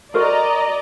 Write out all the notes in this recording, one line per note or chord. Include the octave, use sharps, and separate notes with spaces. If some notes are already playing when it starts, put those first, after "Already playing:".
F#4 A#4 C5 D5 D#5 A#5